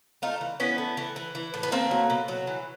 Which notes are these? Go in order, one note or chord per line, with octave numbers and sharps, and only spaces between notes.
A3 D#4 F4
E3
E3 B3 C#4
A3
E3
E3
E3
A2
B3
A3 A#3 C4
F#3
B2
F#3
E3